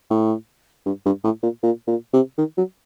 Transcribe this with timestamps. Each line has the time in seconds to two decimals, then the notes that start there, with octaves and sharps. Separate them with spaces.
0.10 A2
0.86 G2
1.06 G2
1.24 A2
1.43 A#2
1.63 A#2
1.87 A#2
2.13 C3
2.38 D#3
2.57 F#3